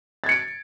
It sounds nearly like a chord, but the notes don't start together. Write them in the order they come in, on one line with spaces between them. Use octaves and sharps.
A6 G#6 C#7 D7